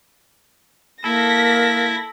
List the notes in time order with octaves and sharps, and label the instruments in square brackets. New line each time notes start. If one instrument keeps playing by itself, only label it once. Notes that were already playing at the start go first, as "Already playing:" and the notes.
[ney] A#3 [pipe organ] E4 [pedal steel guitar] A4 [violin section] A#6 B6